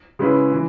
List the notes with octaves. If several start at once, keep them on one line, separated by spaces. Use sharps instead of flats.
C#3 G#3 C#4 E4 B4
E3